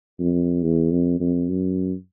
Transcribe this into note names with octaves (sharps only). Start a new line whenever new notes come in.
F2
E2
F2
F2
F#2